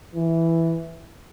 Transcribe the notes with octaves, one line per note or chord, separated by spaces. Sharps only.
E3